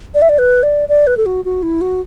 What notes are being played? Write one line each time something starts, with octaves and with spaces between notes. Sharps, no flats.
D5
E5
D5
B4
D5
D5
B4
A4
F#4
F#4
E4
F#4